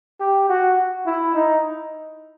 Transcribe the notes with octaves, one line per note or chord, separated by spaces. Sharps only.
G4
F#4
E4
D#4